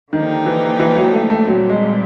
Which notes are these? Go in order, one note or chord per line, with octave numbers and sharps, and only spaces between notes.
D3 D#3 F3 A#3 D#4 G4
E3
E3
F#3
A3
A3
A#2 F#3 G3 C4
G#3